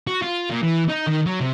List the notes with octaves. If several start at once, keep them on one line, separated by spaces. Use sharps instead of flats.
F#4
F4
A#2
E3
D#4
D#3
F#3
C3